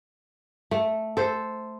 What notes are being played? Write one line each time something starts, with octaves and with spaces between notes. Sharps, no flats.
A3
A4 C5